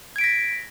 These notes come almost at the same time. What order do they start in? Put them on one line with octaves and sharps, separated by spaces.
G#6 D7 B6 A#6